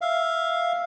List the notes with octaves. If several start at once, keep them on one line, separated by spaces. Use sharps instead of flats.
E5 F5